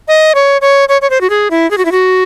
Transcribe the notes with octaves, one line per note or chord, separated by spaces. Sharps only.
D#5
C#5
C#5
C#5
C#5
C5
F#4
G#4
E4
G#4
F#4
E4
F#4